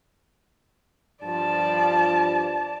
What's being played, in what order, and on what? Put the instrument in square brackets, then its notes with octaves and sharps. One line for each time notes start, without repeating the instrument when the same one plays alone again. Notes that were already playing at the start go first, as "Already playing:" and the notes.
[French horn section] G2 F3 [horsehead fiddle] D5 A5